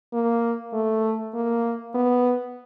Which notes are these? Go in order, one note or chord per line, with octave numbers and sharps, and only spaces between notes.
A#3
A3
A#3
B3